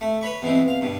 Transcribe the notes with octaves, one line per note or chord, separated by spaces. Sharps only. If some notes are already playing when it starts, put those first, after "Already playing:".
A3
B4 C#5 B5 C#6
B2 E3 G#3 C4
F5
G2 B2